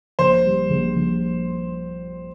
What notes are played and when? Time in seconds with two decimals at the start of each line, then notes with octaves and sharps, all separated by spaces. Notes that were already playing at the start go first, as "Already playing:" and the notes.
0.19 A#1 C5
0.45 G3
0.70 A#1
0.95 A#1